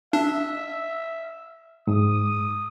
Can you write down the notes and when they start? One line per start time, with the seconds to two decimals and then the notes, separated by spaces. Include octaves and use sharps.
0.13 D4 E5
1.87 G#2 D#6